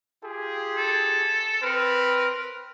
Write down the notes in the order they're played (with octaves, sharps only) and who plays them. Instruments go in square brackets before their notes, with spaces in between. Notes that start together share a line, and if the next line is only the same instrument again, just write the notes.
[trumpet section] F4 G4 G#4
[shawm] A4
[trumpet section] C4 B4 [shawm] A#4